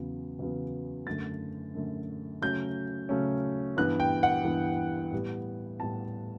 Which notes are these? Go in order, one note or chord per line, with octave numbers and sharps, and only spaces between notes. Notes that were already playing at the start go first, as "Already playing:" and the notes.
Already playing: E2 C#3 F#3 B3
E2 C#3 F#3 B3
F#2 D3 A3 A6
F#2 D3 A3
C#3 F#3 A3 C#4 G6
C#3 F#3 A3 C#4
G2 E3 B3 F#6
G5
F#5
G2 E3 B3
A2 G3 B3
A2 G3 B3 A5